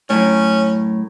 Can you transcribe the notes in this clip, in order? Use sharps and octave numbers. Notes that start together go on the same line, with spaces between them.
F#2 A2 C#4